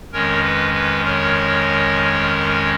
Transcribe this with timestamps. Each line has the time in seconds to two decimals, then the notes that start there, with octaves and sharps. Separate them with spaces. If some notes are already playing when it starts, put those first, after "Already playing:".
0.12 F2 D#3 G#3 C#4 A#4 C#5
0.43 B4
0.74 B4
1.04 A#4 C#5